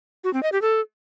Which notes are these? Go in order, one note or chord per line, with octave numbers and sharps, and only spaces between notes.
F#4
C4
D#5
G4
A4